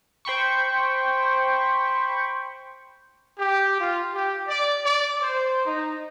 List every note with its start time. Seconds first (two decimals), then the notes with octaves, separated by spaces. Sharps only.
0.25 C5 G5 B5 C#6
3.39 G4
3.81 F4
4.13 G4
4.48 D5
4.85 D5
5.22 C5
5.65 D#4